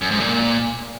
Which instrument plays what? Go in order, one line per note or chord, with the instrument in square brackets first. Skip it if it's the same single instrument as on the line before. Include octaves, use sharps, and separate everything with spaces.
[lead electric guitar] F#2
G#2
A#2